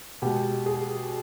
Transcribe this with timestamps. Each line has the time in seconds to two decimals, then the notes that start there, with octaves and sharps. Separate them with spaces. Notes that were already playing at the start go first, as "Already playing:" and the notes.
0.22 B2 G#3 G4
0.66 G#4